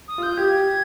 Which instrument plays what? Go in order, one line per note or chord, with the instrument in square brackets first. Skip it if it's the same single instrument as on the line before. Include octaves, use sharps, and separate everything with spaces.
[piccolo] D#6
[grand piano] F4 [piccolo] G6
[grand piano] G4 [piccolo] G#6